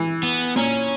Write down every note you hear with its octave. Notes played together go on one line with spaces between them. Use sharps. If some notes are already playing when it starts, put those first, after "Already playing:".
Already playing: E3
B3
A#2 C#4